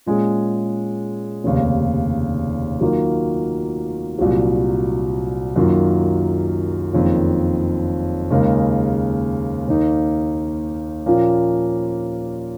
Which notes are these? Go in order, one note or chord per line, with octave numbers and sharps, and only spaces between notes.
A#2 G#3 C#4 G#4
F1 D#2 C#3
D#3 F#3 A#3 F4
C2 A#2 F#3
F#2 D#3 A#3 F4
F#1 F2 D#3
D#2 C#3 G#3 D#4 A#4
D#2 D#3 A#3 D#4
A#2 F3 A#3 C#4